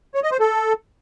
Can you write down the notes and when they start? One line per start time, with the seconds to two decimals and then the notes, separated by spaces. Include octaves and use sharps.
0.15 C#5
0.23 D#5
0.31 C5
0.40 A4